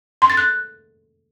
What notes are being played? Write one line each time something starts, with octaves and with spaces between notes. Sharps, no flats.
C6
A6
F#6